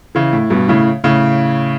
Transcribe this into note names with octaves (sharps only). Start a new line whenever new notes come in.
C#3 E3
A2
G2 B2
A2 C#3
A2 C#3